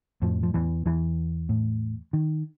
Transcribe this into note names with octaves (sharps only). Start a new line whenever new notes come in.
F2 A2 F3
F3
E2 E3
E2 E3
A2
D#3